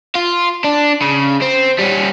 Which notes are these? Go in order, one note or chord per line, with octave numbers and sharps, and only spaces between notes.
F4
D4
C#3
C4
G3 C#4